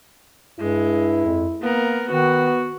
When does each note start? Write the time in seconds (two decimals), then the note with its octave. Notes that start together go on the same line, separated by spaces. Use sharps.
0.60 G2 G#3 E4
1.25 F2
1.62 A#3 B3 A#4
2.11 D#3 B3 F#4